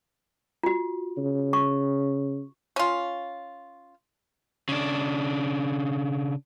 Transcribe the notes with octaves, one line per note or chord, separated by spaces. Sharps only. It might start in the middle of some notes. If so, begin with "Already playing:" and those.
F4 F#4
C#3
C#6
C#4 F4
C#3 D4